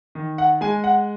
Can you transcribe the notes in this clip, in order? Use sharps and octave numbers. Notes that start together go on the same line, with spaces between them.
D#3
F#5
G#3 G#5
F#5